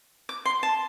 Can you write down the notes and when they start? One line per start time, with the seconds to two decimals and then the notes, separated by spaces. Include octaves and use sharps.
0.29 D6
0.45 C6
0.63 A5